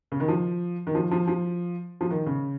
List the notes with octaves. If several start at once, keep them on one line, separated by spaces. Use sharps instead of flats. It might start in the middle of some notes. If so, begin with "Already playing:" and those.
C#3
D#3
F3
D#3
F3
F3
F3
F3
D#3
C#3